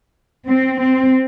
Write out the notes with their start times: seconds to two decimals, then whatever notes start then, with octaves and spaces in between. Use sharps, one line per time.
0.47 C4
0.80 C4